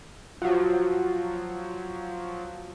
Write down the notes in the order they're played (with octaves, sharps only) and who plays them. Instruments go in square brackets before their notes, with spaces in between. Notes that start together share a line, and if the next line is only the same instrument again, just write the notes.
[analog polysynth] F3 F#3 [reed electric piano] F4 F#4